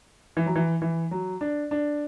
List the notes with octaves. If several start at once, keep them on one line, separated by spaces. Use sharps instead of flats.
E3
F#3
E3
E3
F#3
D4
D4